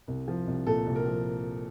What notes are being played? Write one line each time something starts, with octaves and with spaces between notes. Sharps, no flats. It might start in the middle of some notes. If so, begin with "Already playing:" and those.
C2
F3
C2
A#2 A4
C2
A#4
F3